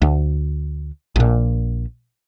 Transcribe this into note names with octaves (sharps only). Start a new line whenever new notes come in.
D2
A#1 A#2